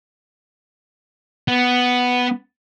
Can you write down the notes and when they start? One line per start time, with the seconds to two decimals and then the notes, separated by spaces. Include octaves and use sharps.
1.48 B3